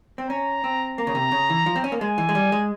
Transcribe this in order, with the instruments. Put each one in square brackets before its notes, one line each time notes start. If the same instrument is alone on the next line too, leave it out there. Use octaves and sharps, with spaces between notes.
[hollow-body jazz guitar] C4
[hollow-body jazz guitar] C#4 [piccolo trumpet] A#5
[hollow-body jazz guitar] C4
[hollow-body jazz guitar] A#3 [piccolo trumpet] A#5
[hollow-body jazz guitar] C#3
C3
C#3
E3
F3
C4
C#4
A#3
[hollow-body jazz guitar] G#3 [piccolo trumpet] G#5
[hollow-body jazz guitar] E3
G#3
G3
G#3